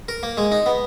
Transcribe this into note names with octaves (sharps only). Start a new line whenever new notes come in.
A#4
A#3
G#3
D#4
B3